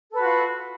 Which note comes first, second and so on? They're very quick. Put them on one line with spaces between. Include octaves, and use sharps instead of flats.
A4 B4 F#4 F4